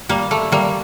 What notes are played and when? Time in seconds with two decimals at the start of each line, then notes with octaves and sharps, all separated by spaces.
0.09 G3 A#3
0.31 A3
0.52 G3 A#3